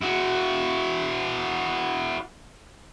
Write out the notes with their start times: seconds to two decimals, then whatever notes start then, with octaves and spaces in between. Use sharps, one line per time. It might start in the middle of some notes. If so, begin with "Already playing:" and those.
0.03 E4 F#4